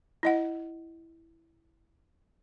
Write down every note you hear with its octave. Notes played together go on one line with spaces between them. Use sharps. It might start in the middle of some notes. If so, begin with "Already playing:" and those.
E4 D#5 F#5